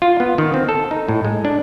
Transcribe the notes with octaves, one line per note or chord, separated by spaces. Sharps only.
F4
B3
D#3
C4
A4
D#4
A2
G#3
D4